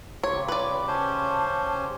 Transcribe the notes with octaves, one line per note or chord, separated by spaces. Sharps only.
C#3 G4 C#5 C6
B4 D5
C#4 C5 A5